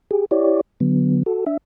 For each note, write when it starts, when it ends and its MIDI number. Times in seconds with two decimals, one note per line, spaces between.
0.11 0.26 67
0.11 0.26 68
0.31 0.61 64
0.31 0.61 67
0.31 0.61 73
0.31 0.61 74
0.80 1.23 50
0.80 1.23 54
0.80 1.23 59
1.26 1.45 66
1.26 1.45 69
1.46 1.57 62
1.46 1.57 76